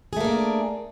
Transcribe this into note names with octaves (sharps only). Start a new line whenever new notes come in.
A3 A#3 D4 G#4